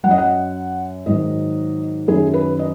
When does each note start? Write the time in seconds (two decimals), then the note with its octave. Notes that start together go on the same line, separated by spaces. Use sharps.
0.03 F#2 F#3 F#5
0.11 D#5
0.18 F#5
1.06 G#2 D#3 F#3 D#5
2.08 F#2 D#3 F#3 G#4
2.34 B4
2.59 D#5